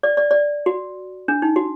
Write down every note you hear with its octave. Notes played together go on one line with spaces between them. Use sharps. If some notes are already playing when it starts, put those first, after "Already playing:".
D5
D5
D5
F#4
D4
D#4
F#4